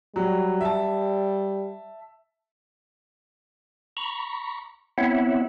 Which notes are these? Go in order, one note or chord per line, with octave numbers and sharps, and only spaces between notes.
F#3 G3
E5 A5
A#5 B5 C#6
B3 C4 E4 C#5 E5 F#5